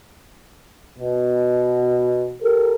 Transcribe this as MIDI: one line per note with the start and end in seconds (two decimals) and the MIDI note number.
0.99 2.35 47
2.42 2.75 67
2.42 2.75 69
2.42 2.75 70